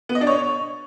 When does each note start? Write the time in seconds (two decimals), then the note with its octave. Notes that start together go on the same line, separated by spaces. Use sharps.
0.09 B3
0.15 D#5
0.21 D4
0.27 C#5